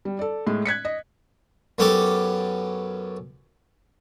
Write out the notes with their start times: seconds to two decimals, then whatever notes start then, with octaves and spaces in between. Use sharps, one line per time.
0.05 G3
0.19 A4 D5
0.47 A2 G#3
0.66 F#6 G#6 B6 C#7
0.85 D#5
1.78 F#2 B3 C#4 G4 A4 D6